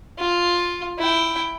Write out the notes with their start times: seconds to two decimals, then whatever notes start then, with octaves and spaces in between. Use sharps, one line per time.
0.18 F4
0.99 E4 G5